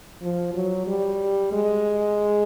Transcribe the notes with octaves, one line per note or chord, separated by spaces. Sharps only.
F3
F#3
G3
G#3